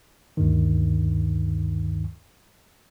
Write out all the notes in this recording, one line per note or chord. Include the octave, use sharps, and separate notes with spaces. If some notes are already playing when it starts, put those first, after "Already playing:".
D2 G2 D#3